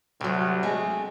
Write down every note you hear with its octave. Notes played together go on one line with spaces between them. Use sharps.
D2 C3 F#3
G#3 A3 C4